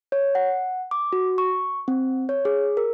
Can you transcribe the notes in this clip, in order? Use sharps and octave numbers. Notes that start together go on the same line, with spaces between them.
C#5
F#5
D6
F#4
C#6
C4
C#5
G#4
A#4